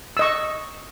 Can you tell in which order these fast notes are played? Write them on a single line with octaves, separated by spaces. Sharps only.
E6 D#5 C#6